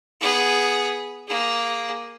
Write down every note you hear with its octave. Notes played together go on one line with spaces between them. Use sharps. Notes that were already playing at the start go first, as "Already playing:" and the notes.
B3 G#4
A#3 G#4